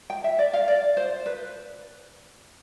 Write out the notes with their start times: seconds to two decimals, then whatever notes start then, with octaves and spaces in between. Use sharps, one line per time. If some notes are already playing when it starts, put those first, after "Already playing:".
0.10 G5
0.24 E5
0.39 D5
0.53 F5
0.68 D5
0.97 C5
1.26 B4